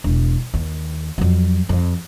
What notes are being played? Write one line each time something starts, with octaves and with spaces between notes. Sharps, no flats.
E1
D#2
F2 F#3
F2